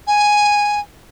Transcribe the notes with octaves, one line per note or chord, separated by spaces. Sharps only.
G#5